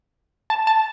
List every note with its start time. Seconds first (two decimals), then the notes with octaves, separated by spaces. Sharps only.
0.50 A5
0.67 A5